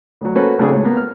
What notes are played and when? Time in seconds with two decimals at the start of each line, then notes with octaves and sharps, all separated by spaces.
0.21 D2 F#3
0.35 A#3 C#4 F#4 A4 B4 C5
0.59 B1 C#3 A3 C4 D4 G#4
0.72 C#2 A2 C#5
0.84 A#3 B3
0.97 F6